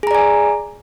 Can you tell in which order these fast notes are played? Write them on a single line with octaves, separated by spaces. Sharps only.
G#4 A#5 D5 G#5